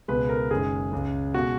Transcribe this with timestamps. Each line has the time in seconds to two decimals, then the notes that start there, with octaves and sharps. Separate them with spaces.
0.08 C#2 B2 G#3 B4
0.29 A#4
0.50 F#1 F#2 D#3 G#3 G#4
0.92 C#2 C#3 G#3
1.34 B2 G#3 F#4